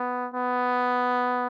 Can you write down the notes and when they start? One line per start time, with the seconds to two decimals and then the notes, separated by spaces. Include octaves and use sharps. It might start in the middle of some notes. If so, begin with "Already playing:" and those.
Already playing: B3
0.34 B3